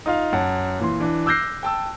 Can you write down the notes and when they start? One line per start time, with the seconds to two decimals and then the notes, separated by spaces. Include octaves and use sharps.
0.06 D#4 F4 F5
0.32 F#2 F#5 A5
0.79 A#2 E3 C6
1.00 E3 D4
1.26 D6 E6 F#6 G6 A#6 C7
1.63 G5 A5 E6